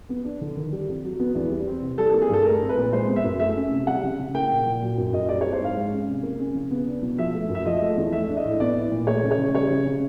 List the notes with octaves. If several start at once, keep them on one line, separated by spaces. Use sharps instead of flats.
B3
D4
D3
D#3
G3
F2
F#3
B3
E2
G3
C4
C3
G3 A4
A4
A#3
G#4
G2 A4
A3 A#4
C4
B4
A#2
G#3 C5
B3
E5
F#2
A3 E5
C#4
C3
G3 F#5
C#3
C#3
A#3 G5
A#2
A#2
F#3
F#2
F#2 D#5
G3 D5
C#5
C4
C5
G#2 F5
G#3
C#4
C3
A#3
C#4
C#3
B3
D4
B2
F3 E5
A3
F#2
E5
F3 D#5
A3
E2
A3 E5
D4
D#5
A2
B3 D5
E4
A#2
A3 C#5
C#3
C#5
C#3
G3 C#5
C#3
C#3